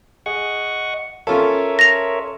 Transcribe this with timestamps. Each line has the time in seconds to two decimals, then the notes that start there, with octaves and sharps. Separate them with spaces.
0.26 G#4 D#5 F#5 C#6
1.27 C#4 F4 A4 A#4 C#5 E5
1.79 A#6 F7